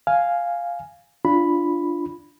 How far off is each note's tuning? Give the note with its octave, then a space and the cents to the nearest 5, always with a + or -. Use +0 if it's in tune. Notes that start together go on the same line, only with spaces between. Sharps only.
F5 +0 G#5 +0
D4 +0 F4 -15 B5 +0